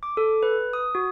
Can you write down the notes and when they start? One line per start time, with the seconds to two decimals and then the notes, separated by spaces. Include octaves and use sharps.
0.03 D6
0.17 A4
0.43 B4
0.73 D#6
0.95 F#4